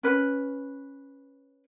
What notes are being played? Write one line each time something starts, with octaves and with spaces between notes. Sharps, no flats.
C#4 B4